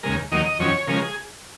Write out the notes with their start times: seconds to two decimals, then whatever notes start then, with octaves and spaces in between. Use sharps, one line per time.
0.03 D#2 C#3 G#3 A#4
0.31 D#2 D#3 F#3 A#3 D#5
0.45 D#5
0.59 F2 D#3 F#3 C#4 C#5
0.87 C#3 F3 G#3 C#4 A#4
1.02 G#4